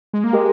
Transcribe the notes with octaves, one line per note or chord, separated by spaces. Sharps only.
G#3
A#3
G#3 G4 A#4